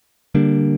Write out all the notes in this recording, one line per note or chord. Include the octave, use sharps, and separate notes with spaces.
D3 G3 A#3 D4